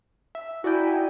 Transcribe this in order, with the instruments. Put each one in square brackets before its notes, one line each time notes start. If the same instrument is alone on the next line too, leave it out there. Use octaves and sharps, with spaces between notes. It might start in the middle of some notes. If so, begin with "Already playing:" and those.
[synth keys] E5
[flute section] E4 G#5 A#5 [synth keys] F#4 D5 G5
[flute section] D#4